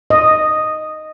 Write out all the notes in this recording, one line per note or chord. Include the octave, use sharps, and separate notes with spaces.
D#5